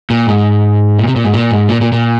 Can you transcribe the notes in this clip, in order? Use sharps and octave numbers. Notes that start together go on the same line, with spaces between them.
A#2
G#2
A#2
C3
A#2
G#2
A#2
G#2
A#2
A#2
A#2